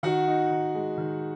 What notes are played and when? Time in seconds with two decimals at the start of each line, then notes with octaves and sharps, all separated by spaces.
0.03 D#3 F#4 F#5
0.28 D#4
0.51 D#3
0.75 G#3
0.98 D#3